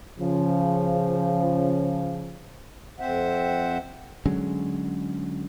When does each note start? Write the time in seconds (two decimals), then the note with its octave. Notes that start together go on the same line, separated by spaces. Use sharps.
0.20 C#3 F3
3.00 F2 C4 C5 E5 F#5
4.26 D3 F#3 G#3 C#4